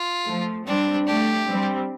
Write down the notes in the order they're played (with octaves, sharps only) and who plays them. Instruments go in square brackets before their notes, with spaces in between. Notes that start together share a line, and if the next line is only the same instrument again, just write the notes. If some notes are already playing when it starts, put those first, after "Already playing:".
Already playing: [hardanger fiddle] F4
[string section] F3 A3
[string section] G3 C4 [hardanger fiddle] D4
[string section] A3 D4 [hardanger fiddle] G4
[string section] G3 C4